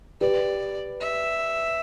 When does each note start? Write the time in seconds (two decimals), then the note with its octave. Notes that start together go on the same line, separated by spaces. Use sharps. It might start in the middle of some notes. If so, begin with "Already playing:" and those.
0.21 G4 B4 D5
1.01 E5